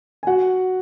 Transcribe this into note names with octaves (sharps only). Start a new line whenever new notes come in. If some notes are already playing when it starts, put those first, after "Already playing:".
G#5
F#4 F#5